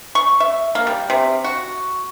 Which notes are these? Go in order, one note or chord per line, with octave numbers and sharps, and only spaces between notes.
C#6
E5
A#3
G3
C3
F#4